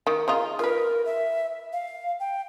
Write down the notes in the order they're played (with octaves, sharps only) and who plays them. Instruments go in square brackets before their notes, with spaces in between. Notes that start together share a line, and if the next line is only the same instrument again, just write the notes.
[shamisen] D#3
C#3 D#4 F4
[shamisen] F4 B4 [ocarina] A#4
[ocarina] E5
F5
G5